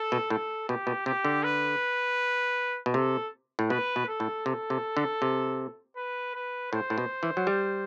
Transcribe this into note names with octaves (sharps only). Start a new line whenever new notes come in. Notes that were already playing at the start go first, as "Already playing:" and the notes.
Already playing: A4
B2
A2 A4
B2 G4
B2
C3 G4
D3
B4
B2
C3 A4
A2
B2 B4
B2
A4
A2
C3 A4
C3
D3
C3
B4
B4
A2 C5
A2
B2
E3
F#3
G3